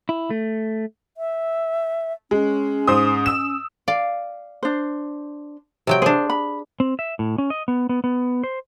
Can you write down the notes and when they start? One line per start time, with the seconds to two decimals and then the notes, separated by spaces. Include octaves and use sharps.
0.09 E4
0.30 A3
1.17 E5
2.31 G#3 C#4
2.88 G#2 C5 D#6
3.26 E6 E7
3.88 D5 F5
4.63 D4 C5
5.87 C3 F#3 G5
6.02 D4 G#4 C5
6.30 B5
6.80 C4
6.99 E5
7.19 A2
7.38 C#4
7.50 D#5
7.68 B3
7.89 B3
8.04 B3
8.44 C5